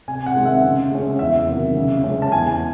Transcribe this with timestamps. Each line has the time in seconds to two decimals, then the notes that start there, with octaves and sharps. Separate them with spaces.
0.08 C3 G#5
0.26 F#5
0.36 D#3 G#3 C4
0.45 E5
0.64 C#3
0.92 G#3 C#4
1.19 E2 E5
1.47 C3 D#3 F#3
1.75 C#3
2.04 G#3 C#4
2.22 A5
2.32 E2 G#5